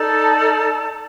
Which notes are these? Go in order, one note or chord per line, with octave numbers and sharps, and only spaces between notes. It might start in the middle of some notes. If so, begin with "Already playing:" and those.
Already playing: D#4 A4 D5 A5